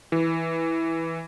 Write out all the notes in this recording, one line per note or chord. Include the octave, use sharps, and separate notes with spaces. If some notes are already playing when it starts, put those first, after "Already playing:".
E3